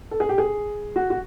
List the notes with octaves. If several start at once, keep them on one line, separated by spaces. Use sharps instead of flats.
A4
G#4
G4
G#4
F#4
F#4